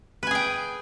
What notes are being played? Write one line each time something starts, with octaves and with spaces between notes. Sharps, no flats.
G#4 B4 G5 G#5